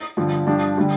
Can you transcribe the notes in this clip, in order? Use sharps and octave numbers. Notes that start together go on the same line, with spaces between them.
G2 D3 F3
G2 F3 D4 G4
D3 G3